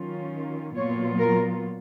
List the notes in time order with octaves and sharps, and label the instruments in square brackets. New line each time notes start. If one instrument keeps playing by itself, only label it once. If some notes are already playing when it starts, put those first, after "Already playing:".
Already playing: [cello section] D#3 F#3 C#4 F4
A#2 F#3 B3 F4 C#5
A#4